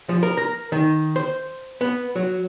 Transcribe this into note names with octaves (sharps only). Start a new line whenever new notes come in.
F3
A#4
A#4
D#3
C5
B3
F#3